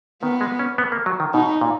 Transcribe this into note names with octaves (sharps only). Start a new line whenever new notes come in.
D#3 B3
G#3
C#4
B3
A#3
F#3
D#3
B2 D#4
A#2